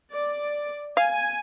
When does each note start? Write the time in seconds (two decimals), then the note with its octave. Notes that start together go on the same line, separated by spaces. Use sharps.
0.13 D5
0.97 F5 G#5